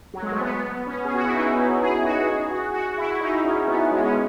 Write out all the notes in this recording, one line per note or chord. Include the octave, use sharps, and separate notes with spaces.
F#3
G#3
A3
B3
C#4
G#4
F#4
E4
D#4
E4
G#4
F#4
G#4
F#4
F#4
E4
D#4
C#4
B3
G#3
C#4